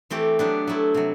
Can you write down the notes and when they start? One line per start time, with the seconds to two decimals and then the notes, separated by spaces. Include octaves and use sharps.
0.10 E3 A3 C4 G4
0.39 F#3 B3 D4 G4
0.67 F#3 A3 E4
0.94 C3 F#3